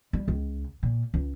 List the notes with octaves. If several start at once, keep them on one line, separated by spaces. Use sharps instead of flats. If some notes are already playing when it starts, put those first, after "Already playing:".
G3
C#2
A#2
C#2